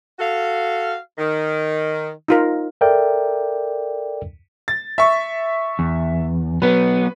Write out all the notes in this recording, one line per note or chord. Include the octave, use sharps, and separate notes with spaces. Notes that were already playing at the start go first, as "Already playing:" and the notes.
F#4 A4 F5
D#3
D#4 F4 A#4
A4 A#4 D5 E5 G5
A6
E5 C#6
E2
F#3 B3 B4